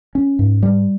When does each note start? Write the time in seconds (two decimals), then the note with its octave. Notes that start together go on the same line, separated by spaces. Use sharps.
0.15 C#4
0.39 G#2
0.63 G3